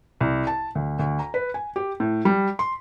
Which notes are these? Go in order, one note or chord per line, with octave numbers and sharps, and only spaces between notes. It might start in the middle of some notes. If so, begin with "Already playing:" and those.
C2
A5
D2
D2
A#5
B4
G#5
G4
A2
G3
C6